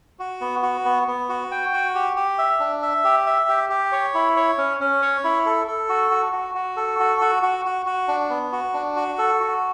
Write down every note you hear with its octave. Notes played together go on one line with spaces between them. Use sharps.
F#4
B3
F#4
B3
B3
F#4
G5
F#4
G4
G4
E5
D4
E5
G4
E5
G4
G4
C#5
E4
C#5
C#4
C#4
C#5
E4
A4
A4
F#4
F#4
F#4
F#4
A4
F#4
F#4
F#4
F#4
F#4
D4
B3
F#4
D4
F#4
A4
F#4